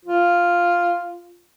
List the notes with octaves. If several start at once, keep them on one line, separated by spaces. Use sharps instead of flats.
F4